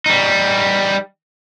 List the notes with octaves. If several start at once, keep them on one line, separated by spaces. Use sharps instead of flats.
G3 D#4